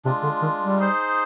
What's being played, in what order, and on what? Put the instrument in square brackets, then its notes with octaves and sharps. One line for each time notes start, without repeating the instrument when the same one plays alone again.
[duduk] C3 [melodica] G#3 D4 F4
[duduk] D3
D#3
G3
[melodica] D#4 G#4 C5